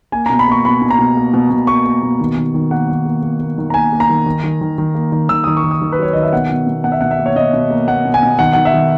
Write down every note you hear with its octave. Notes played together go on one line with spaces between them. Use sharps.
A#3 G#5
B2 A#5
B5
A#3 C#6
B2 B5
B2
A#5
B2
A#3
B2
B2
A#3 C#6
A#3
B2
D#3
D#3
D#3
A#3 F#5
D#3
A#3
A#3
A#3
D#3
A#5
A#3 G#5
A#3
A#5
D#3
D#3
D#3
D#3
D#3
A#3
D#3
D#3 E6
D#3 D#6
C#6
D#3
D#6
D#3
B4
F#3 C#5
D#3 D#5
E5
B2 F#5
B2
B2
B2 F#5
E5
B2 F#5
E5
A#3
C#5
B2 D#5
B2
A#3
A#3 F#5
B2
G#5
B2
D#3 F#5
D#3 F#5
E5
D#3